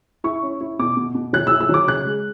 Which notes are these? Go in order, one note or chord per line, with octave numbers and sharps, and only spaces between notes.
E4 C#6
C#4
E4
B2 D6
B2
B2
F#3 F#6
E6
E4
E6
F#3 D6
C#3 F#6
G#3